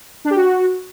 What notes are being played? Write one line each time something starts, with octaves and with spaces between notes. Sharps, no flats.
D4
G4
F#4